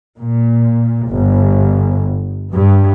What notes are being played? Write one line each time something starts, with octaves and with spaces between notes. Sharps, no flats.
A#2
G1
G2